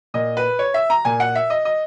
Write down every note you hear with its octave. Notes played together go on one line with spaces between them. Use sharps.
A#2 D#5
B4
C#5
E5
A#5
A#2 G#5
F#5
E5
D#5
D#5